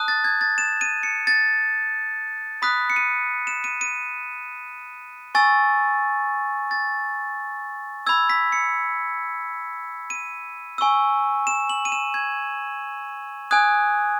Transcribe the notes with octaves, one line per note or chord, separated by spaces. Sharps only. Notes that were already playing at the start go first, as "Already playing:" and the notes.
Already playing: A5 D#6 F#6
A6
G#6
A6
E7
D#7
C#7
A6
B5 D#6 F#6 B6
C#7
D#7
E7
D#7
D#7
G#5 C#6 E6 A6
A6
B5 E6 G#6
B6
C#7
D#7
G#5 C#6 E6
E7
F#7
D#7
E7
G#6
G#5 D#6 F#6 G#6